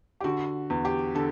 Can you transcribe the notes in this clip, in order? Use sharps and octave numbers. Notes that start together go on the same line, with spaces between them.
G4
D3 F#4
E2
G4
D3 A4